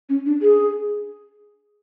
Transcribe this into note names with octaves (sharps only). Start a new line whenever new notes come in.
C#4
D4
G#4